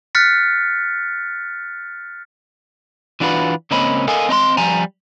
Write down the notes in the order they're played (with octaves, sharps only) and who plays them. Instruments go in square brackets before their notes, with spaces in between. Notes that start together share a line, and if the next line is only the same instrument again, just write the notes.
[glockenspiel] F6 F#6 A6 B6 C#7
[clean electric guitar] E3 D4 F4 F#4 B4
C#2 A#3 C4 C#4 D#5 B5
A4 A#4 D#5 F5 G#5
C4 D#5 A#5 C6
F3 G3 G#5 A#5